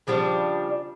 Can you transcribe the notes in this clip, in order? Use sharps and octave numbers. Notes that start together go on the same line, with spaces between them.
C#3 F3 G3 D4